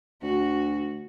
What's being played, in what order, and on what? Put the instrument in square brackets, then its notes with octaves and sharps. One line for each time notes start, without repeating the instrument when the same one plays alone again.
[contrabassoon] D2 [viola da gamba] F#4